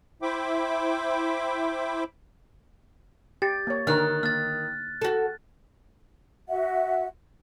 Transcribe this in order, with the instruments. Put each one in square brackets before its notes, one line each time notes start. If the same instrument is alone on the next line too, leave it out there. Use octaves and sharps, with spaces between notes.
[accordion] E4 C5 E5 G5 B5 D6
[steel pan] G4 [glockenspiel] A6
[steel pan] A#3 C#5
[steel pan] D3 D#4 A#4 [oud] D#3 [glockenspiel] F6 F#6
[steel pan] A#3 [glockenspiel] F6 A6
[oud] F#4 A4
[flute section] F#4 E5 F#5